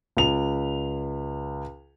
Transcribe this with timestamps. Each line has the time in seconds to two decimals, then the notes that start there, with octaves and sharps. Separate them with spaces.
0.17 C#2 F7